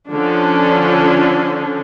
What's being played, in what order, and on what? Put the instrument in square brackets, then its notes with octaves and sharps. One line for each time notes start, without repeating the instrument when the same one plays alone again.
[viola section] D3 F3 C#4 D4 A4